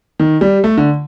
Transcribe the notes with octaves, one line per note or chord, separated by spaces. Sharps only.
D#3
G3
A3
D3